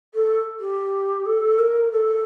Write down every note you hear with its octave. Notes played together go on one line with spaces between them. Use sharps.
A4
G4
A4
A#4
A4